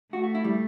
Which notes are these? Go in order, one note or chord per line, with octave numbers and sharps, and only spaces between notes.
A3 F#4
F#4
E4
G3